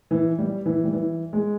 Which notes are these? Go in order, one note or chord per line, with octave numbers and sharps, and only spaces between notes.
E3
G3
E3
G3
E3
G#3